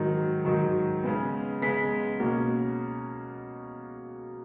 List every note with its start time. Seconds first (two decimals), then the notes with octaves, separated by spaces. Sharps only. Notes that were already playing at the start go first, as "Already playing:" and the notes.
Already playing: G#2 D#3 F#3
0.45 G#2 D#3 F#3
1.04 C#3 G#3 B3
1.62 C#3 G#3 B3 B6
2.20 B2 A#3 C#4